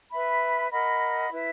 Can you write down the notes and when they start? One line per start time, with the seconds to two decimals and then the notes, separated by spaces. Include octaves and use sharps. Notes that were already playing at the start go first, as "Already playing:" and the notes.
0.11 B4 E5 B5
0.70 A#4 D#5 F#5 B5
1.30 E4 B4 E5